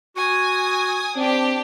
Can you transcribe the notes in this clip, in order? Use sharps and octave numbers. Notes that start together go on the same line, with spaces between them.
F#4 G#5 D#6
C4 D4 G4